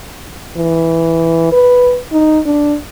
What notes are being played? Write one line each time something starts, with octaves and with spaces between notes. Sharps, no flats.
E3
B4
D#4
D4